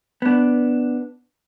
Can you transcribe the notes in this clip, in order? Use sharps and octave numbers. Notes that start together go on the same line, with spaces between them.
B3 D4